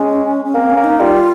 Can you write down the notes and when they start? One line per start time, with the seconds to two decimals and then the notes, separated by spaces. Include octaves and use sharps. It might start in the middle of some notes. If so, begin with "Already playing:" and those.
Already playing: G#3 C#4
0.45 C#4
0.54 A#3 C4
0.70 C#4
0.77 A#3
0.84 D#4
1.00 G3 F4